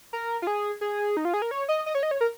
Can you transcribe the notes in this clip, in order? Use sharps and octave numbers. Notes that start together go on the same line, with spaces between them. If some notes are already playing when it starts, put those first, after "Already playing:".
A#4
F4
G#4
G#4
D#4
F4
G#4
A#4
C#5
D#5
D#5
C#5
D#5
C#5
A#4